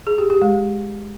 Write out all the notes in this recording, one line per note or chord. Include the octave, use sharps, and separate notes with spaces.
G#4
G4
G4
G#3